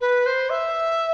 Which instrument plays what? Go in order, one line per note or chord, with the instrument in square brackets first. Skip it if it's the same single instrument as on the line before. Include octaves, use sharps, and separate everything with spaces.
[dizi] B4
C5
E5